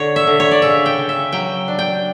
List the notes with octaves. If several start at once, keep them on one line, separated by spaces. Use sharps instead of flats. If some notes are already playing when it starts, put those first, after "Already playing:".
Already playing: D3 C#5
E5
D3
C#5
D5
C#3 E5
G5
C#3
E5
F#3 G5
D4
G5